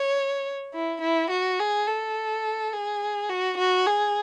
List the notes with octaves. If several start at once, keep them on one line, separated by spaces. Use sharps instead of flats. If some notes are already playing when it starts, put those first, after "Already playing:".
Already playing: C#5
E4
E4
F#4
G#4
A4
G#4
F#4
F#4
G#4